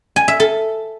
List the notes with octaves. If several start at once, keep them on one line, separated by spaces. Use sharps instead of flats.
G#5
E5
A4